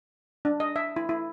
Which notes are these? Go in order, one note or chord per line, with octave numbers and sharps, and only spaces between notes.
D4
D#5
E5
E4
E4